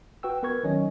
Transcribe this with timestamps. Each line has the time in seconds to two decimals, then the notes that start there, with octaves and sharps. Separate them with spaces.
0.23 F#4 B4 G5 E6
0.43 B3 A#4 B4 C#6 G#6
0.63 D#3 F#3 C#4 C#5 D#5